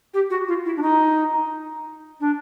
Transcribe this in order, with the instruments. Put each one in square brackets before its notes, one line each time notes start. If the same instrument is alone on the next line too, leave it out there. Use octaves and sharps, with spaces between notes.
[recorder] G4
F#4
F4
E4
D4
D#4
D4